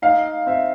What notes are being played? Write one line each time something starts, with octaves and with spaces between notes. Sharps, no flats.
D#4 F5
C4 E5